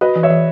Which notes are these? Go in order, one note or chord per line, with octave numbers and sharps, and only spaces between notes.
F#4 B4 D#5
E3
C#5 E5
E3